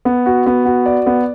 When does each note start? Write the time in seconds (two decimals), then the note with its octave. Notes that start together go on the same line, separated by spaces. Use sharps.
0.05 B3
0.26 F#4
0.46 B3
0.65 F#4
0.86 D5
1.06 B3